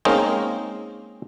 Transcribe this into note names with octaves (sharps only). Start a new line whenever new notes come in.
G#3 A#3 C4 C#4 D#4 A#4